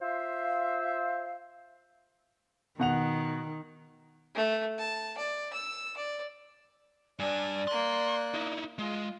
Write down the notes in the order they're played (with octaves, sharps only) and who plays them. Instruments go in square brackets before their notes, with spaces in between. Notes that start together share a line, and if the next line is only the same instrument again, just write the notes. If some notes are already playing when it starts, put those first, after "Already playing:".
[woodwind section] F4 C5 E5 F5
[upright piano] B2 F#5 F7 [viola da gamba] D#3
[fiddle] A3
A5
D5
E6
D5
[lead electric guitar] G2 D4 [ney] D5 [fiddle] G#5
[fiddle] A#3 F#6 [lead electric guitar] C6
[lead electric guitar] D#4 E4
[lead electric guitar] G#3 [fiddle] F4